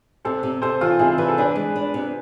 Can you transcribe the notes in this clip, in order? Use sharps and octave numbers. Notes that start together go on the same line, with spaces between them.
C3 A4 C5
C3
C3 A4 C5
E3 F4 A4
C3 E4 G#4
E3 B4
A4
D4 G#4 B4
G#3
D4
C3